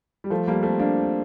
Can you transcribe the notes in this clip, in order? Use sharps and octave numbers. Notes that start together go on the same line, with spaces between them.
G3
F3 A3
G3 A#3
A3 C4
A#3 D4